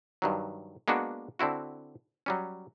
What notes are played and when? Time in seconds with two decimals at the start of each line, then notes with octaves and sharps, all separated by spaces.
0.22 G2 D#3 F#3
0.88 G#3 A#3 B3 D4 F#4
1.39 D3 C4 E4 F#4
2.26 F#3 G3 C#4